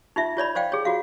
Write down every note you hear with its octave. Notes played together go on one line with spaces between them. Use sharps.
D#4 F4 E5
F4 C#5 D5 B5
C5 D5 F5 G5
G#4 C#5
F4 F#4 F5